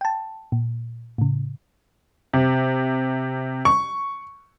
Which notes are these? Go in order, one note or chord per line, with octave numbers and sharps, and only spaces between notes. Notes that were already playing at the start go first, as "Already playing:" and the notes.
G5 A5
A#2
A2 C#3
C3
C#6